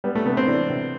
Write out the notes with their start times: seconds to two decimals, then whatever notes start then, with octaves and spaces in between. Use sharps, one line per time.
0.04 G3 B3
0.15 A3
0.25 C3 B3
0.37 C4
0.47 E3 D4
0.70 C3